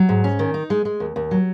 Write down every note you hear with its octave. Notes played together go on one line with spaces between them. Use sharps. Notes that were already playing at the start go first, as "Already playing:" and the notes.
Already playing: F#3
G#2
C#4
D#3
D#4
G#3
G#3
D#2
D#2
F#3